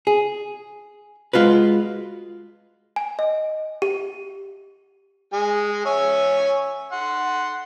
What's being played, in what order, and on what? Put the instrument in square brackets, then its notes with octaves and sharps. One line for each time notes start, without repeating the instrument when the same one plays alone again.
[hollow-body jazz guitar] G#4
G#3 F4 F#4 B4
[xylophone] G#5
D#5
G4
[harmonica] G#3 G#5
C#5 E5 G#5
F#5 C6